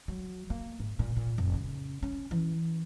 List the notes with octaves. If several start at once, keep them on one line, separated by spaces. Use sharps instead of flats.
F#3
A#3
G#2
A#2
A#2
F1
C#3
C#4
E3